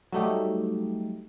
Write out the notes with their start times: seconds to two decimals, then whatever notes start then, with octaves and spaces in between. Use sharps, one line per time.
0.12 F#3 G3 A3 D#4 G4